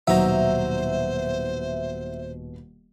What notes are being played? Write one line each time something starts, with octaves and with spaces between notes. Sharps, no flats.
D#1 B2 F#3 D#4 C5 E5 A#6